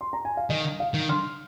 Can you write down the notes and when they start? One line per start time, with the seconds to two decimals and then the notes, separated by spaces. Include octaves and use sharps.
0.01 C6
0.13 A#5
0.25 G#5
0.37 F5
0.50 D#3 D#5
0.80 F5
0.94 D#3
1.09 C6 F6